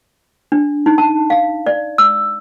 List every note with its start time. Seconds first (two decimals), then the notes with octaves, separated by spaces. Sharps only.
0.52 D4
0.86 D#4
0.98 A5
1.30 F5
1.66 D5
1.98 E6